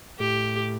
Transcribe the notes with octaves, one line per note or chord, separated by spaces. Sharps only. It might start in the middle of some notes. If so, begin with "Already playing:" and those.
A2 G4